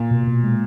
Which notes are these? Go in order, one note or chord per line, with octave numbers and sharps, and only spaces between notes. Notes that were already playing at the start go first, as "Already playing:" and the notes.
Already playing: A#2
B2
B2
G#3